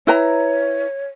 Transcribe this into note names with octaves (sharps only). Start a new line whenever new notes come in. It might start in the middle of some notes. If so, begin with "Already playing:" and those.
E4 B4 C#5 A#5